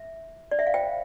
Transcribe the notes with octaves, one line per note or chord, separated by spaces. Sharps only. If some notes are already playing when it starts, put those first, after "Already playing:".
Already playing: E5
D5
E5
F5
F4 C5 G5